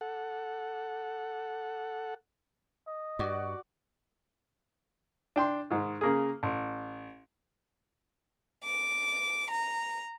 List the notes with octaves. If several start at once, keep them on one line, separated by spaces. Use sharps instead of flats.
A4 F#5
D#5
G2 F#4 D5
D4 G5 C6
G#2 D#3
C#3 A#3 G#4
A1
D6
A#5